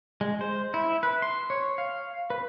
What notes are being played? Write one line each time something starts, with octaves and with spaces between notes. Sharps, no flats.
G#3
C5
E4
B4
C6
C#5
F5
B4